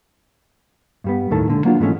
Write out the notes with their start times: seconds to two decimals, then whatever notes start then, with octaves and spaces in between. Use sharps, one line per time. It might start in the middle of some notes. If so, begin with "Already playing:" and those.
1.04 G2 G3 B3
1.31 D#2 A2 D#3 A4 A5
1.48 A#2 D3 G#3
1.65 F#3 A#3 B3 D4 F4
1.80 G#2 E3 G#3 A3 C#4